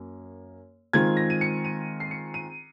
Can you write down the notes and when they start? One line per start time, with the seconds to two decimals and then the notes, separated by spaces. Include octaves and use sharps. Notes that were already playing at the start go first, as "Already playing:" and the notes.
Already playing: F#2 A#3
0.93 D#3 G#3 C4 F4 G#6
1.17 A#6
1.30 D#7
1.41 C#7
1.65 D#7
2.00 C7
2.11 C#7
2.34 D#7